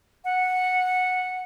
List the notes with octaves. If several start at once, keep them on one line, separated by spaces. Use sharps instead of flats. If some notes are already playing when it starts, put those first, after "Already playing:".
F#5